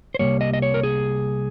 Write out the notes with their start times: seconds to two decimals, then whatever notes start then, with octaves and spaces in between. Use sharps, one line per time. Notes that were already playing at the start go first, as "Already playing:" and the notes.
0.15 C5
0.19 C2 A#2 G3 A#3 C#5
0.41 D#5
0.54 D#5
0.62 C#5
0.74 A#4
0.83 G#4